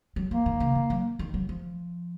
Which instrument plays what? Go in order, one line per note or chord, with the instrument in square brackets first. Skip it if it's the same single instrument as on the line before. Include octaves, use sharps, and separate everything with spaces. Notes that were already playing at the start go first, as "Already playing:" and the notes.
[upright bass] F#3
[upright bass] F3 [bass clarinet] A#3
[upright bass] D#3
C#3
D#3
F#3
D#3
F#3
F3